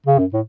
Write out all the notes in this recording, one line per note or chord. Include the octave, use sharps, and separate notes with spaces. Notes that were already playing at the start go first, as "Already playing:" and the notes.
C#3
F#2
A2